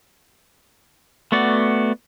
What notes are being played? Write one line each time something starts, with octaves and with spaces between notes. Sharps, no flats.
A3 B3 F#4 D5